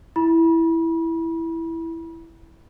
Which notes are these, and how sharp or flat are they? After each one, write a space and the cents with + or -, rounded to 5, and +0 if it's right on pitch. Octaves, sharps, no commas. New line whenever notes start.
E4 +0 B5 -35